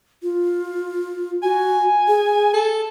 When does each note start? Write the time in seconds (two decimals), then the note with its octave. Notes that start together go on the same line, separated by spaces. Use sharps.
0.23 F4
1.43 F#4 G#5
2.08 G#4
2.53 A4